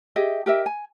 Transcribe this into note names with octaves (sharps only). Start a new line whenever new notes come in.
G4 G#4 D#5 E5
G4 A#4 D#5 E5
G#5